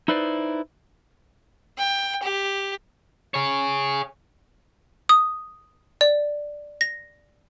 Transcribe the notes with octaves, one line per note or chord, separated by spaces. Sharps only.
D#4 E4 B4 C5 D5
G5
G4
G#4 C#5
D#6
D5
A#6